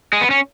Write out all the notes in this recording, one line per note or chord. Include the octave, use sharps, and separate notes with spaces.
G#3
B3
C#4